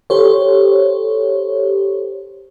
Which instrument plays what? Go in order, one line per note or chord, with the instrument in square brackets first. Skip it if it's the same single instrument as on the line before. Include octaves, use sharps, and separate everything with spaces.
[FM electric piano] G4 A4 C5 C#5